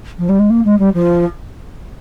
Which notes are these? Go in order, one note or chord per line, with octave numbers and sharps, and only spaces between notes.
F3
G3
G#3
A#3
G#3
G3
F3